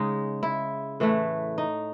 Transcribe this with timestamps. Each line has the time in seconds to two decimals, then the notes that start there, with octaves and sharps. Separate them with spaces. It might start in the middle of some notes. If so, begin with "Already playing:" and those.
Already playing: C#3 G#3 D#4
0.43 E4
1.00 A2 E3 A3
1.58 D#4